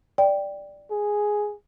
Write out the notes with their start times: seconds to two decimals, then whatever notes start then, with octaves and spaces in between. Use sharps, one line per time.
0.18 D5 G5
0.91 G#4